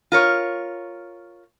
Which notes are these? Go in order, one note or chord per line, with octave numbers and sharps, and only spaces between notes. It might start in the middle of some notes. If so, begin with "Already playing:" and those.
F4 A#4 C#5